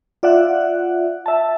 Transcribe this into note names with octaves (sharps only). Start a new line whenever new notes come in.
F4 D5 E5 F#5 F#6
E5 A5